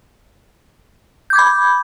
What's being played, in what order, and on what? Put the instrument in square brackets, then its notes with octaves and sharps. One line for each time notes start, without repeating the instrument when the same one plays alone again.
[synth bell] G6
D6
G#6
B5